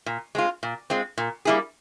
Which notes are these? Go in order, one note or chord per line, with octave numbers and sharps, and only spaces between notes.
A#2
G#3 C4 F4
A#2
G#3 C4 F4
A#2
G3 A#3 E4 G#4